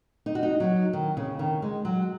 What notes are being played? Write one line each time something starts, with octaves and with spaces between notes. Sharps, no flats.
D#4
F#4
D#4
F#3
D#3
C#3
D#3
G#3
F#3